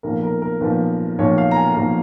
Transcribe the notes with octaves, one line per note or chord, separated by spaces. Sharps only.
B1 A#2 F3 A#4
A#4
A#4
B1 A#2 F3 B4
B1 A#2 F3 C#5
F5
A#5
G#5
B1 A#2 F3 A#5